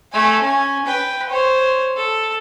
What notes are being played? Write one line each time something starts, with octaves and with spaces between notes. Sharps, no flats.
A3 G#5
C#4 G#5
B4 G5
C5 C#5
A4